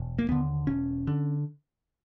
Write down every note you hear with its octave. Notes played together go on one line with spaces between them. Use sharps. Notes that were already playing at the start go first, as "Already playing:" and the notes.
Already playing: E1
A#3
D#2 D3 B3
E1 C#4
D3